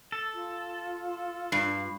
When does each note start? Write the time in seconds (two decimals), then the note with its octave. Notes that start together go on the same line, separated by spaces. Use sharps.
0.12 A4
0.34 F4
1.52 G2 C7